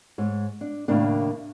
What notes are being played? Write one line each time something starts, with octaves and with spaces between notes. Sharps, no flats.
G#2 C#5
D4
D#2 A2 C#3 A#3 D4